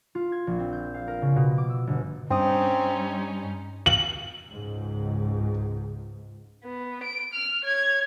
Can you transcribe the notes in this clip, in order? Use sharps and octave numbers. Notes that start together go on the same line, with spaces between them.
F4
G#6
A#1
C4
G6
F5
A#4
C#3
B2
D6
E6
G1
G2 G3 C4 C#4 D#4 D#6
F#7
C#2 G#2
B3
D7
F6
C#5 G#6